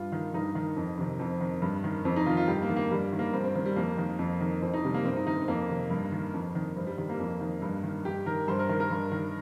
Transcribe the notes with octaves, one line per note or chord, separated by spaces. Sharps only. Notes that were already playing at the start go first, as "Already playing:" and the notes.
Already playing: G2 F4
D#3
G2 D#4
D#3
F2
C3 D#3
F2 C4
D#3
G2
D#3
F2 C4
D#4
D#3 F4
F4
G2 G4
A#3
D#3
A#3
G2 G3
D#3
A#3
G2 C4
C4
D#3 C4
G3
F2 A#3
D#3
F2
D#3
F2 C4
D#4
C3 D#3 G3
A#3
G2 C4
D#4
D#3 D#4
C4
F2 A#3
C3 D#3
G2
D#3
F2
D#3
G2 C4
G3
D#3 G3
A#3
F2
D#3
G2
D#3
G2 G4
D#3 A#4
G2 C5
A#4
D#3 A#4
A#4
G2
D#3